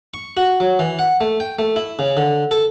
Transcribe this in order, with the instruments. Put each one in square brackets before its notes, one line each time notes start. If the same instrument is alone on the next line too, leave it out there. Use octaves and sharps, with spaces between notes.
[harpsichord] C#6
F#4
F#3
E3
F#5
A3
G5
A3
E4
C#3
D3
A4